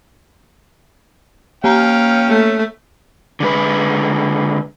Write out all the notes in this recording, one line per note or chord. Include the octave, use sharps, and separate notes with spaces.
A#3 C#4 F5 G5 A#5
A3
D3 G#3 B4